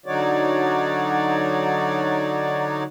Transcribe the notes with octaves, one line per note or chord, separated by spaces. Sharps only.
D3 F#3 D#4 F#4 C#5 D5